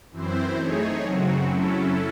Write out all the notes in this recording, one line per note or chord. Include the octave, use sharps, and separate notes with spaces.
F#2 E3 C4 E4 C5
A3 D#4 G#4 C#5
F#2 C#3 F#3 C4 F#4
F#3 C#4 E4 A4